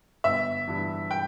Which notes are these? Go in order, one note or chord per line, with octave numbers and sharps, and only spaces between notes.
G1 E5
G2 E3
G5